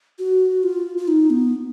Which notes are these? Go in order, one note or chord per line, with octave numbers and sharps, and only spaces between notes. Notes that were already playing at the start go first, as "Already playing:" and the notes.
F#4
F4
F4
D#4
B3